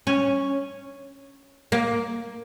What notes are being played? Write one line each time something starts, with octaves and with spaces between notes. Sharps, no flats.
C#4
A#3